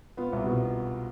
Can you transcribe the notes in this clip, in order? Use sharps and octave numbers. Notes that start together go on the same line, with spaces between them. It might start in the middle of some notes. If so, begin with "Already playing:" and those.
B3 F4
C2
B2